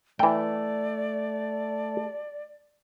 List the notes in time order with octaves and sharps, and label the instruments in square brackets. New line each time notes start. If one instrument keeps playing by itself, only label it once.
[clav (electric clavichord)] E3 G5 [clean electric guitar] A3 [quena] D5